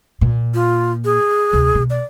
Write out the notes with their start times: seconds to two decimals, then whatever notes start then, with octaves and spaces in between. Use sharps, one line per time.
0.21 A#2
0.54 F4
1.05 G#4
1.53 D2 C3
1.75 B2
1.90 D5